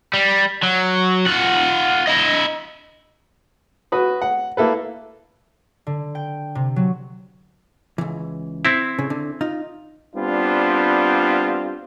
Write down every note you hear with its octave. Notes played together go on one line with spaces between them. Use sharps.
G3
F#3
F4 F#5
E4 D#5
F#4 B4 D#6
F#5
A#3 E4 A4 B4
D3
G5
C3
F#3
C#2 E3
C4 E4
C#3
D3
D#4 F4
G3 B3 C4 D4 F4